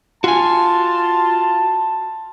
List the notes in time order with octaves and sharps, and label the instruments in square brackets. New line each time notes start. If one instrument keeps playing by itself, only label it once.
[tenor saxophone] F4 [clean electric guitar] F#4 G#5 [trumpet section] A5